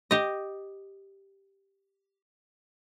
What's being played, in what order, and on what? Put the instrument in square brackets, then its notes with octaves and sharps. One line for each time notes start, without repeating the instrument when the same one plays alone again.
[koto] G4 D#5